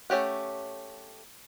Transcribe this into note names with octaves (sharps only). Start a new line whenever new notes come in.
A3 C#4 G4 F#5